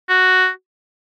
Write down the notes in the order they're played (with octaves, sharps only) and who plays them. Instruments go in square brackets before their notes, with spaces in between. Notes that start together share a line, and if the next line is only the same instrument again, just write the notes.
[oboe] F#4